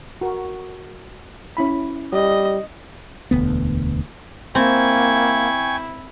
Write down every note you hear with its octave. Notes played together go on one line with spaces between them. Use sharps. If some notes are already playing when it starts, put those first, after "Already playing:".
F#4 A#4
C#4 E4 B5
G3 D#5
E1 D2 B3
A#3 C4 E4 G5 G#5 C#6